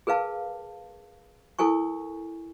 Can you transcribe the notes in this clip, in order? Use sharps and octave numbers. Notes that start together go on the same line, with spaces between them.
G#4 A#4 B4 F5 A5
E4 A4 A#4 G#5 C#6